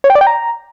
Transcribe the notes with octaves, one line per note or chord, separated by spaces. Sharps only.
C#5
G5
D5
G5
A#5